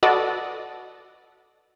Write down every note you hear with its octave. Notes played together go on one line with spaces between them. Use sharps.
F#4 A4 B4 D5 D#5 F#5